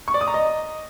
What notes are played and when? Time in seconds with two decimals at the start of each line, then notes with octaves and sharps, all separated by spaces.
0.08 C#6
0.14 D5
0.21 D#6
0.27 A#5
0.34 D#5